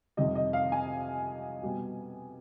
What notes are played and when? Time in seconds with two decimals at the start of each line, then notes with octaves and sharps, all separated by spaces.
0.17 F2 C3 D#3 G3 D#5
0.35 D#5
0.53 F5
0.72 G#5
1.62 B2 G3 B3